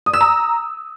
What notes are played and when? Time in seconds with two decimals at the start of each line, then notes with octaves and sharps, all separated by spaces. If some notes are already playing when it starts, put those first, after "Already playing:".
0.06 D#6
0.13 E6
0.21 A#5